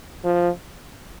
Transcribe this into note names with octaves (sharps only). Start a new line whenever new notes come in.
F3